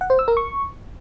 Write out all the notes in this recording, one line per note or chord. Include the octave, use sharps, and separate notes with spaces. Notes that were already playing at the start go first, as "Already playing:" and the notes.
F#5
C5
E6
A#4
C#6